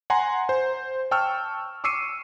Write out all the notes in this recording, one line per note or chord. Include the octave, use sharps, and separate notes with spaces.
F#5 G#5 A#5 C6
C5
G5 A5 C#6 E6 F6
C#6 D6 E6 C7 C#7 D#7